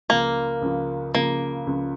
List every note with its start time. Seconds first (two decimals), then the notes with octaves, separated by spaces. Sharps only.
0.09 C#2 C#3 F3 A#3
0.62 C#2 C#3 F3
1.14 C#2 C#3 F3 A#3
1.67 C#2 C#3 F3